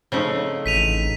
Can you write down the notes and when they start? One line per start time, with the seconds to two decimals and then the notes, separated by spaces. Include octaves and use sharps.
0.12 C#3 F3 A3 C4 D#4
0.66 A1 B6 D#7 F7